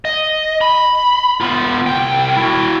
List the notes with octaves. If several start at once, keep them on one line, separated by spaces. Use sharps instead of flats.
D#5
B5
B3 F4
C2 G5
E4 F#4